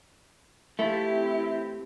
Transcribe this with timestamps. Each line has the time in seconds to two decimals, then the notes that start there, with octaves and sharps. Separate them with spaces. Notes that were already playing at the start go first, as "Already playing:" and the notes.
0.79 E3 A3 E4 F4 G4 A5
1.10 C4